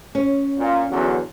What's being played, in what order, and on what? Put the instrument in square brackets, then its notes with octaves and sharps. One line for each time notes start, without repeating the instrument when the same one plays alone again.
[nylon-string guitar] C#4
[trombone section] A#2
E2 D3 F#3